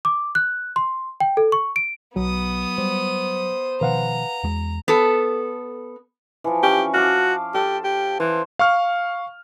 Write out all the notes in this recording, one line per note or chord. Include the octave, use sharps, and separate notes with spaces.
D6
F#6
C6
G5
A4
C#6
D7
B1 B2 F#3 B3 D#6
G3 C5
B2 D#3 F3 B4 F5 F#5 A#5
E2 G#3
B3 A4
E3 F3
C#4 G4
F#4 F5 A5 D6
G4 A4
G4
E3 C5
F5 C#6 F6